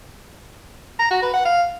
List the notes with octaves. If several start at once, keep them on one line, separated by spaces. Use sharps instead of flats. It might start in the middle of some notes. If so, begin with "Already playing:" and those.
A#5
F#4
B4
F#5
F5